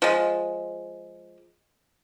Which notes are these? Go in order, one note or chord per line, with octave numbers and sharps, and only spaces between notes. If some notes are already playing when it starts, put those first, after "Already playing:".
F3 G#3